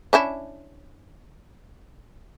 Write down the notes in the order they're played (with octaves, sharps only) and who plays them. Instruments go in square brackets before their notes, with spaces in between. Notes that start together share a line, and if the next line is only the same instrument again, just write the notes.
[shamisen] C#4 D4 E4